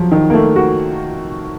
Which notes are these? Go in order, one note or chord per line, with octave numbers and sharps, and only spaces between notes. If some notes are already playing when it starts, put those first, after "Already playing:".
Already playing: F3 F#3
D#3
A#3
A3
F#4